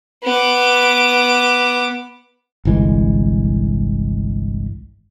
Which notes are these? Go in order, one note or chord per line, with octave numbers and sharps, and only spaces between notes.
B3 D6
G1 C2 E3 G#3